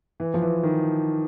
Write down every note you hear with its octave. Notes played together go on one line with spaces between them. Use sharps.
E3
F3
E3
D#3